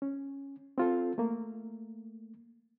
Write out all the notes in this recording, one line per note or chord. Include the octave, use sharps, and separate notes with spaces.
C#4
C4 F4 A4
A3 A#3